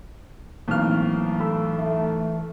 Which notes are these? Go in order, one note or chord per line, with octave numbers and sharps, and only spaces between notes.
B1 A2 E3 A#3 C4 F6
A3 B5 E6
A3 E5